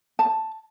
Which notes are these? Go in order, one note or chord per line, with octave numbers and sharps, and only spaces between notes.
A5